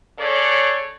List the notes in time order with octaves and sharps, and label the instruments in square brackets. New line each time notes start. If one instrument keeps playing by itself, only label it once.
[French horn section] C#3 A4 C#5 D5